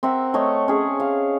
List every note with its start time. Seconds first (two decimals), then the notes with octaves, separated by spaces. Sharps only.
0.03 C4 A#4 E5 F#5
0.34 A3 C#5 D#5 F#5
0.68 C#4 G#4
1.00 F5